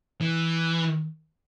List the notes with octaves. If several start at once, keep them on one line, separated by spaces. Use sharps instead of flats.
E3